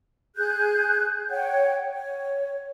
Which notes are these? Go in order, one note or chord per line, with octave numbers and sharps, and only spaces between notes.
G#4 F#6 G6
C#5 F#5 G5
C#5